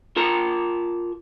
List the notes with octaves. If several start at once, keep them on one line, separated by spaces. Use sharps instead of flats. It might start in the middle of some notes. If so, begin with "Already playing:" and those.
F4 A#4 A5 A#5